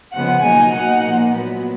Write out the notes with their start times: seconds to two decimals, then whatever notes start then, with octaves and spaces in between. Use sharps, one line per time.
0.13 C#3 F3 G#3 B3 F#5
0.42 B2 F#3 A#3 D#4 G#5
0.72 B2 A#3 D#4 F#5
1.03 A#2 F3 A#3
1.33 A#2 F#3 B3